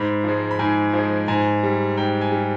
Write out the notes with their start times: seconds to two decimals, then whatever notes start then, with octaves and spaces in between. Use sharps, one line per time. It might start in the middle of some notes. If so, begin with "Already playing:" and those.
Already playing: G#2 B5
0.24 F3 G#3
0.51 B5
0.59 G#2 G#5
0.94 F3 G#3
1.28 G#2 G#5
1.63 G3
1.97 G#2 G5
2.21 G#5
2.32 G3